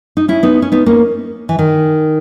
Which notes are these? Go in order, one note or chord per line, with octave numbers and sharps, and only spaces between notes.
D#4
C#4 E4
B3 D#4
C#4
B3 D#4
A#3 C#4
E3
D#3